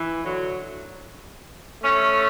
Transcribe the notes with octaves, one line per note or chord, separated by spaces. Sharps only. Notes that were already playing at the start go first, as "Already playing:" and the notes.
Already playing: E3
D3 F#3
A3 C#4